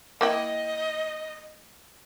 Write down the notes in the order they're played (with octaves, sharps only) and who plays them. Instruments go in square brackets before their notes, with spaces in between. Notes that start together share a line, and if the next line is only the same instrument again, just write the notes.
[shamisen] A#3 E4 G5 [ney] D#5